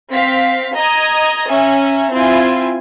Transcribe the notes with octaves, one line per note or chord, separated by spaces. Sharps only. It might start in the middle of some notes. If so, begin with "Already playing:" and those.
C4 F5 B6
D#5 A#5 D#6 G#6
C#4 E5 A#5
C4 E4 F4 G#5